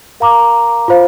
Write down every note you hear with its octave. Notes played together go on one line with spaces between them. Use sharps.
A#4 F5 A#5 D6
F4 C5 F5